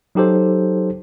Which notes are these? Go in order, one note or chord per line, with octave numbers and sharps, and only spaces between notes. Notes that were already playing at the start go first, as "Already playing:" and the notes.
F#3 D#4 G4 A4 C5